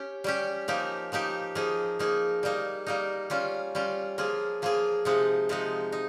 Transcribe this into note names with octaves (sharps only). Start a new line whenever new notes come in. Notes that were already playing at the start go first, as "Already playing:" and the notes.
Already playing: C#4 G4
G3 C#4 G4
F3 A#3 D#4 G4
F3 A#3 D#4 G4
F3 A#3 D#4 G#4
F3 A#3 D#4 G#4
G3 A#3 D#4
G3 A#3 D#4
G3 C#4 F4
G3 C#4 F4
F3 A#3 F4 G#4
F3 A#3 F4 G#4
C3 F3 G#3 D#4
C3 F3 G#3 D#4
D#4